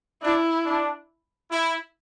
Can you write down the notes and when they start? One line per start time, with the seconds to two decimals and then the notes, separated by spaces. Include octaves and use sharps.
0.22 D4 E4
0.65 D4
1.51 E4